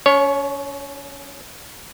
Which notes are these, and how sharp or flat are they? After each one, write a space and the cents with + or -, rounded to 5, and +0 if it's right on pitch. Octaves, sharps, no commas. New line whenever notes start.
C#4 +35 C#5 +0